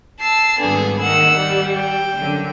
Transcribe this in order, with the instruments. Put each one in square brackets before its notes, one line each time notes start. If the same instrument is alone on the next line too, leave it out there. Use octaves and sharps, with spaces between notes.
[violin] A5 E6 [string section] C7
[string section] G#1 G2 D3 [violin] B3 G#4
[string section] D#3 A#3 [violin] F#5 E6
[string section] G3
[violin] G5
[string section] F#2 D3